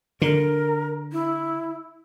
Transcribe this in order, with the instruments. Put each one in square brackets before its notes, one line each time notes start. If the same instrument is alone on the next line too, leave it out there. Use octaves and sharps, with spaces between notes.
[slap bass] D3 [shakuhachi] A#4
[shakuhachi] E4